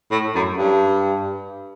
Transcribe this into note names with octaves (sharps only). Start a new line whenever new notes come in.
A2
F#2
G2